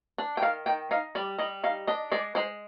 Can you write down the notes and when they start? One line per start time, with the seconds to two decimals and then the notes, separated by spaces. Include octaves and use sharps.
0.18 D4
0.37 G5
0.42 D#3 F5
0.66 D#3 G5
0.91 D#4 F5
1.15 G3 D5
1.38 G3 D#5
1.64 D#4 F5
1.87 D4 D#5
2.12 G#3 D5
2.35 G#3 C5